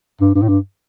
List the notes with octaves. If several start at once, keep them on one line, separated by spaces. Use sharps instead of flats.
G2
G2
A2
G2